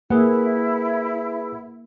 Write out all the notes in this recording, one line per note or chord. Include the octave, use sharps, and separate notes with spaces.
A#3 E4 G#4 B4 F#5